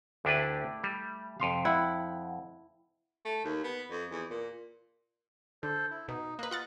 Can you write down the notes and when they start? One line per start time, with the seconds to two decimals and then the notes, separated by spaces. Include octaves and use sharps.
0.25 D2 A3 D4 E4 G4 B4
0.84 G3
1.40 F2 C3 F5 C6
1.65 E4 F#5 G5
3.25 A3
3.45 D#2
3.64 B3
3.91 F2
4.12 E2
4.30 A#2
5.63 D3 A4 C5
5.91 E4
6.08 B2 D#4
6.39 A#3 B4 D#5 F#6
6.51 F4 F#5 A6